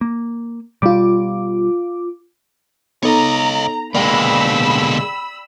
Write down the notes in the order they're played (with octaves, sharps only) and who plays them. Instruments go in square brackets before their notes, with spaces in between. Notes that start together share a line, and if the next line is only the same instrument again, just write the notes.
[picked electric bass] A#3
[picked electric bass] B2 G3 [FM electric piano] F4 D6
[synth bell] B3 D#4 A4 [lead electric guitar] C#5 D#5 [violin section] A#5
[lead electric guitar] B2 D3 [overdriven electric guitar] G#3 A#3 [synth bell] D5 G5 [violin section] B5 E6